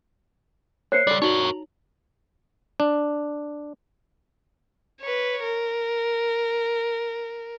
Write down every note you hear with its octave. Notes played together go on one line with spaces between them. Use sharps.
A#3 C5 C#5 E5 F#6 C7 C#7
C#2 G3 A4 D5
D#4 F#4 A#4 C#5 F#7
A#5
D4
B4 C#5
A#4